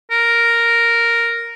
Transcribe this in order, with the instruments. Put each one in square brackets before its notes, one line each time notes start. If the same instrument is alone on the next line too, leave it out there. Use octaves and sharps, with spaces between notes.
[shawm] A#4